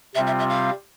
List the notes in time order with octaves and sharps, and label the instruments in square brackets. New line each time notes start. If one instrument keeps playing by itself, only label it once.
[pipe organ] C3 G3 C4 F4 [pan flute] E5
[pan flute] E5
E5
F5